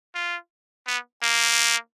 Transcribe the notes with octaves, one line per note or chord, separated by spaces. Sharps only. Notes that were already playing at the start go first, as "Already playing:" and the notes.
F4
B3
A#3